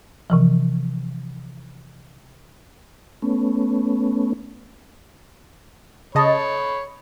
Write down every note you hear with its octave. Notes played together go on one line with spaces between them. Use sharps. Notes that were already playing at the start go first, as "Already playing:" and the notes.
C3 E3 F3
A3 B3 C#4
C#3 C#5 D#5 A5 B5